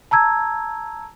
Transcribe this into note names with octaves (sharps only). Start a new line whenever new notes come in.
A5 A#5 E6 G#6